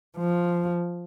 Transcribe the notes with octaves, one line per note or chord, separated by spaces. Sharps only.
F3